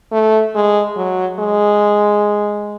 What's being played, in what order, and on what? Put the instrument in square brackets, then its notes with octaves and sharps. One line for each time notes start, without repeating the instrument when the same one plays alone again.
[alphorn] A3
G#3
F#3
G#3